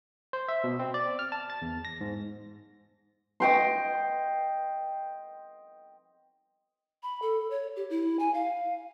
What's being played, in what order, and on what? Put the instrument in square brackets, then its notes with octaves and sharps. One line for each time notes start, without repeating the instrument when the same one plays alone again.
[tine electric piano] C5
E5
B2
C4
D5
F6
A5
A6
E2
A#6
G#2
[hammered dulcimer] D#5 G5 C6
[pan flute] B5
A4
C#5
G4
E4
G#5
F5